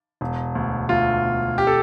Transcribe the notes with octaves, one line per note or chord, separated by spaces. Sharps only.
E1
D2
D2 F4
E1
G4
A4